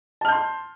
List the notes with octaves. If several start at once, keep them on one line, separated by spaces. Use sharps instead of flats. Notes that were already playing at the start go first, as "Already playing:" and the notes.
A5 C6 F6 G6